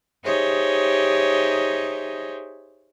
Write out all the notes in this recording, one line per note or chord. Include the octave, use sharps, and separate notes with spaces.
D#4 G4 G#4 C5 C#5 E5